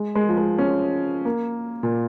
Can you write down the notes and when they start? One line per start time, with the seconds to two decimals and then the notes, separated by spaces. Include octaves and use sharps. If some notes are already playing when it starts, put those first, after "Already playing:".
Already playing: G#3
0.15 G#3
0.29 F3
0.38 G#3
0.58 C#4
1.25 A#3
1.83 A#2